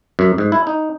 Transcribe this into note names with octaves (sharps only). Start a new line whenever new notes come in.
F#2
G#2
E4
D#4